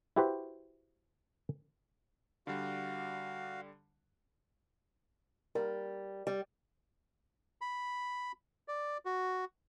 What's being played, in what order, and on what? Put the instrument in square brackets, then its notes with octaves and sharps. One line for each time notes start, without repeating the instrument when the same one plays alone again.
[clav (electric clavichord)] E4 F#4 G4 B4 C5
[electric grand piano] D3 G3 [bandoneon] F#4 F5
[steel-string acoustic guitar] G3 [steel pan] A#4
[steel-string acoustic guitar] G3
[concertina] B5
D5
F#4